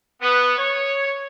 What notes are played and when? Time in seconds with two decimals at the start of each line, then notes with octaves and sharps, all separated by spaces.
0.21 B3
0.58 C#5